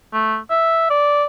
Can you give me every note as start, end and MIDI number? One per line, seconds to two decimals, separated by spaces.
0.13 0.37 57
0.50 0.86 76
0.90 1.25 74